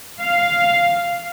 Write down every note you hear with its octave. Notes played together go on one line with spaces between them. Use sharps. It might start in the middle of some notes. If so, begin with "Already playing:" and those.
F5